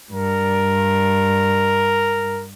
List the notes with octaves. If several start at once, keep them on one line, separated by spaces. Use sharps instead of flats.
G2 A#4